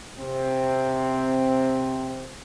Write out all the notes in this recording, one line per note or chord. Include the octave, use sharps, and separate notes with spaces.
C3 C4